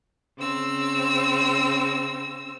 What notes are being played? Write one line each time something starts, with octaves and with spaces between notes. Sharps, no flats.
C#3 C4 E6